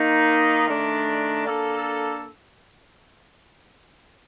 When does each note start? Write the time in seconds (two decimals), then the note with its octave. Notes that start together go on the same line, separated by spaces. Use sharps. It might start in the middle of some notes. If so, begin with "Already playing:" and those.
Already playing: D#3 A#3 D#4
0.67 D#3 A3 D4
1.46 A#3 D4 A4